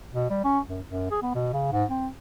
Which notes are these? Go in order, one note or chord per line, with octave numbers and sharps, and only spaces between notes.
B2
G3
C#4
F#2
F#2
G#4
B3
B2
C#3
G#2
C4